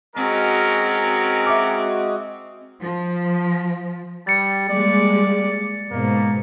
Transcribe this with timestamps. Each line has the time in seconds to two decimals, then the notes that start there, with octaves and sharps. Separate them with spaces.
0.16 G#3 C4 C#4 F#4 A#4 D#5
1.46 E5 D6
2.81 F3
4.27 G3 A6 C#7
4.70 G3 G#3 A#3 D5
5.91 G#2 B2 A#3